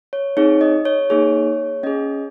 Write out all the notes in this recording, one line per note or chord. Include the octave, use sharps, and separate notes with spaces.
C#5
C4 D#4 G#4 C#5
D#5
C#5
A#3 D#4 G#4 C#5
C#4 G#4 D#5